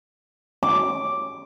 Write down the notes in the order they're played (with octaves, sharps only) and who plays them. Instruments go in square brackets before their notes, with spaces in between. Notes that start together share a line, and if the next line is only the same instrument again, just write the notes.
[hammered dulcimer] D6